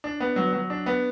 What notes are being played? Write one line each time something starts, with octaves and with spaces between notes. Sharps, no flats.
D4
B3
F#3
F#3
D4
B3